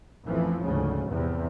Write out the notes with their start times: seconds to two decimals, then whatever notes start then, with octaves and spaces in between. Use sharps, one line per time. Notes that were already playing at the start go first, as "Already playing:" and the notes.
0.24 A1 F2 E3 F3
0.64 D2 G#2 C#3
1.10 E2 C3